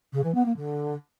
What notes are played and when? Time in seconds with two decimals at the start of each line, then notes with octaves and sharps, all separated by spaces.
0.12 C#3
0.23 E3
0.34 B3
0.45 A#3
0.56 D3